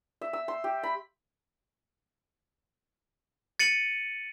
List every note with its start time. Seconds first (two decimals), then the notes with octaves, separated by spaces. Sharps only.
0.21 E5
0.33 E6
0.48 C6
0.64 G4
0.83 B5
3.59 A6 C#7 D#7 F#7